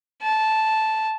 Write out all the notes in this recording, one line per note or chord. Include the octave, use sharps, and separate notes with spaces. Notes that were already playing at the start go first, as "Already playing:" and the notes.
A5